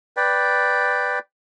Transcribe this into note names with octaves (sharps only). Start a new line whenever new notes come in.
B4 D5 G5